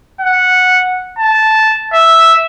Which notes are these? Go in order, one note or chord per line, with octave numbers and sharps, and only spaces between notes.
F#5
A5
E5